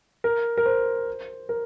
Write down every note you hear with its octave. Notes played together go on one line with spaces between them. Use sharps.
A#4
A#4
C5
A#4